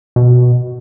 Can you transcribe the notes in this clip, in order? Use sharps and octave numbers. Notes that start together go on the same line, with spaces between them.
B2